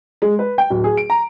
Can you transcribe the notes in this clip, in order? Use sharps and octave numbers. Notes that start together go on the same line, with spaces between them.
G#3
B4
G5
D1
G#4
D7
A#5